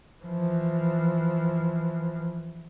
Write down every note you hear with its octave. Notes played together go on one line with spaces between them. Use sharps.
E3 F3